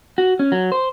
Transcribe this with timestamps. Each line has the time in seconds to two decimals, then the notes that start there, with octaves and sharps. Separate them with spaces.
0.18 F#4
0.39 C#4
0.52 F#3
0.72 C5